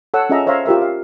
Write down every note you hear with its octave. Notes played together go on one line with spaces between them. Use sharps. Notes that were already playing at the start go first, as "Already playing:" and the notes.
A4 C#5 F#5 E6
C#4 F4 G#4 D#5 E5 A#5
C5 C#5 E5 F5 A#5 C6
F4 G4 A#4 E5
F5